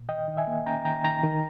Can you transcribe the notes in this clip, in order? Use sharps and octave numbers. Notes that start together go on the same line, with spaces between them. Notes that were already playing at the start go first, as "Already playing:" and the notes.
Already playing: A#2
D#3 D#5 G5
D#3
E5 G#5
A#3
C#4 G5 A#5
D#3 G5 A#5
D#3 G5 A#5
D#3